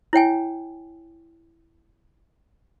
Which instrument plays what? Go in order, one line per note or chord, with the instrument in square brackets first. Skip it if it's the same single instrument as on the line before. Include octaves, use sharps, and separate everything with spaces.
[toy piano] E4 C#5 G5 G#5